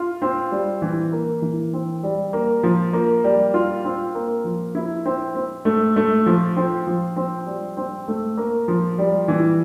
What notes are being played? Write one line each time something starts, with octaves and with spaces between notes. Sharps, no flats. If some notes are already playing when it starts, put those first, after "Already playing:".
Already playing: F4
C4
G3
E3
A#3
E3
C4
G3
A#3
F3
A#3
G3
F4
C4
A#3
F3
E4
C4
C4
A3
A3
F3
C4
F3
C4
G3
C4
A3
A#3
F3
G3
E3